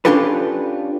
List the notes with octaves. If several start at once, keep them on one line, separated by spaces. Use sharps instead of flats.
C#4 D4 F4 G4 A4 B4